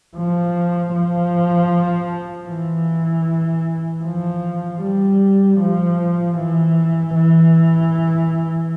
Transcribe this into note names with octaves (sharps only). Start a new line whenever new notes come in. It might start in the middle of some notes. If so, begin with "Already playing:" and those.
F3
F3
E3
F3
G3
F3
E3
E3